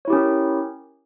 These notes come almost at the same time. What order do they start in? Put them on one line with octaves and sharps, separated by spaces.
C#5 E4 G4 C#4 A#4